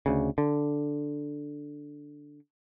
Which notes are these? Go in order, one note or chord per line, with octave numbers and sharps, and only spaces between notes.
D2 C#3
D3